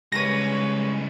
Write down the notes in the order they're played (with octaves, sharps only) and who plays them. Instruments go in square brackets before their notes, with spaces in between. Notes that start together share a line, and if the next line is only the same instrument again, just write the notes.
[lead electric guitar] C#3 G3 [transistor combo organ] G#3 [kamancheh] B4 C#5 [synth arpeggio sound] A#6 D#7